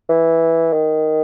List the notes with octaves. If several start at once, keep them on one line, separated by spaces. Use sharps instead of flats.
E3
D#3